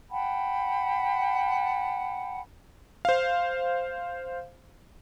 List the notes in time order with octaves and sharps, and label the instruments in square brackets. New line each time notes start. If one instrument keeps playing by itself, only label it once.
[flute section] F#5 G5 A5 B5
[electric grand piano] C5 F5